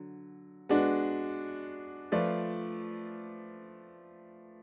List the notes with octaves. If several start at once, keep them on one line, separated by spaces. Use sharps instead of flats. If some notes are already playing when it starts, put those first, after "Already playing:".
Already playing: D3 F#3
G#3 B3 D4 F#4
F3 A3 F4 B4 D5